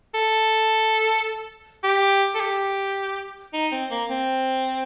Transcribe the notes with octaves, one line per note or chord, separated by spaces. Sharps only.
A4
G4
A4
G4
D#4
C4
A#3
C4